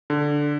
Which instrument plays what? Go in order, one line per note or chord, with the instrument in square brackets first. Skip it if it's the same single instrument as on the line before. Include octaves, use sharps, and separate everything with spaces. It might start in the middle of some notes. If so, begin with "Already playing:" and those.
[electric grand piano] D3